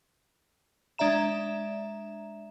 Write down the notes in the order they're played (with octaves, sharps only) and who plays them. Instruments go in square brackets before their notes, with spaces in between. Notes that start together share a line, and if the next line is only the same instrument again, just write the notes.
[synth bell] G#3 D4 D5 E5 A#5 E7